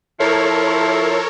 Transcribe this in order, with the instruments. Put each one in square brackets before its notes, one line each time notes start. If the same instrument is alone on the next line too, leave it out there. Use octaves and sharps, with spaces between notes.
[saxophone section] F3 E4 [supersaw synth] A4 A#4 C#5